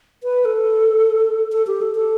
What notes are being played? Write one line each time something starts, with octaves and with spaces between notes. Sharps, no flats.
B4
A4
A4
G4
A4
A4